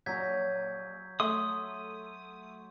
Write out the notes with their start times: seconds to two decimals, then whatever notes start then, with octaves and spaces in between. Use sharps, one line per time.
0.06 A#1 F#3 A#5 G6 G#6 B6
1.20 A3 C6 D#6